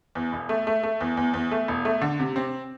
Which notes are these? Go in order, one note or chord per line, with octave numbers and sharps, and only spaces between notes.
E2
E1
A3
A3
A3
E2
E2
E2
A3
E1
A3
D3
C3
C4